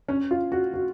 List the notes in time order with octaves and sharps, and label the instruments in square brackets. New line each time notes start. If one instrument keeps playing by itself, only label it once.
[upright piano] C#4
F4
F#4
F#4